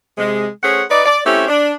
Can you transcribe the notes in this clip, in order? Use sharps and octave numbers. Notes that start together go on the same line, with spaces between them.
C3 G#3
A3 C#4 G#4 C5 F#5
D#4 B4 D5
D5
A3 C4 C#4 E4 G4
D4